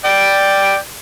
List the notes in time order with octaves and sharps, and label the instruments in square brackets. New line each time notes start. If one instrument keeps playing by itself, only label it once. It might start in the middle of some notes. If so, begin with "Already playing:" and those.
[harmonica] D5 G5